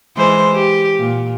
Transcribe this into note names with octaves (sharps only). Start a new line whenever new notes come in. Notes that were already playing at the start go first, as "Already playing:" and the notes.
E3 G#3 C5
G4
A#2